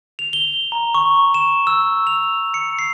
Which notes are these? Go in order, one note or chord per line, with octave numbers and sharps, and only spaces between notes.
F7
G7
A#5
C#6
E7
E6
F7
C#7
C7